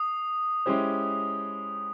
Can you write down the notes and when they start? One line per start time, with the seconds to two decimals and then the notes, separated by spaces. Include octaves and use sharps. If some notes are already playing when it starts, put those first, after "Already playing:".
Already playing: D#6
0.66 G#3 C#4 E4 G4 C5